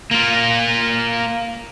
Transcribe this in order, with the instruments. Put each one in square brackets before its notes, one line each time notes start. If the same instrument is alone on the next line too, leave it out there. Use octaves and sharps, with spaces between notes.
[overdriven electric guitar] A#3 F4